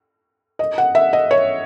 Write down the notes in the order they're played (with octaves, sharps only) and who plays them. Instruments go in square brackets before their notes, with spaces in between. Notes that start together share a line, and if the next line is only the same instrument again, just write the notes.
[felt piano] D#5
F#5
E5
D#5
C#5